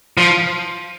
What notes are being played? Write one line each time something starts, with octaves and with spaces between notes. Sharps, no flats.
F3